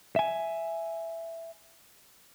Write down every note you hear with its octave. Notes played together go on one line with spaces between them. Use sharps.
E5 G#5